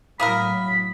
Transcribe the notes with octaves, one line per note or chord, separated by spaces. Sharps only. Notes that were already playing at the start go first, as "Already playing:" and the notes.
A2 F#3 A#3 E4 A#4 B5 D#6